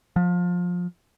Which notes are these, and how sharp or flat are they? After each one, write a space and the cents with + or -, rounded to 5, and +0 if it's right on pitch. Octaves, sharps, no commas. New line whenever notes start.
F3 +25